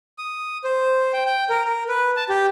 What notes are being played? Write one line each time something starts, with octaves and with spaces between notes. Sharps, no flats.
D#6
C5
G5
G5
A#4
A#4
B4
A5
G4